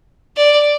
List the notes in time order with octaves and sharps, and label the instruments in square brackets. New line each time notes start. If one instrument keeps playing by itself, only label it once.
[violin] D5